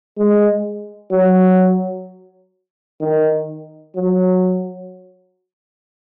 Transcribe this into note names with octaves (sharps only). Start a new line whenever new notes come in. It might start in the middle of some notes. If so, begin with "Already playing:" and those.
G#3
F#3
D#3
F#3